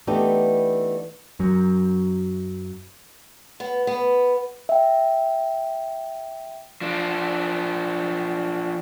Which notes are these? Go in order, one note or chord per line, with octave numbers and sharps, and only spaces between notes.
E3 A3 B3 D4 D#4 G4
F#2 F#3
B3
B3
E5 G5
F3 D4